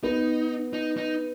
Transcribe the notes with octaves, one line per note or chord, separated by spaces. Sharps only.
B3 D#4
D#4
D#4